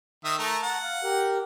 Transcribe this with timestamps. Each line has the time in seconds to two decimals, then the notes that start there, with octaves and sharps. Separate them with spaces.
0.24 D#3 E5 D#6
0.39 A3 A#4 A5 A#5
0.63 F#5
0.83 F5
1.04 G4 A#4